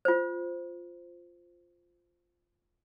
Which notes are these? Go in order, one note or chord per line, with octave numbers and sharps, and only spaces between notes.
F4 C5